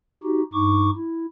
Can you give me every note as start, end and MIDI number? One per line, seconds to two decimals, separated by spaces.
0.23 0.42 63
0.23 0.42 66
0.23 0.42 67
0.53 0.90 43
0.53 0.90 63
0.53 0.90 85
0.53 0.90 86
0.95 1.26 64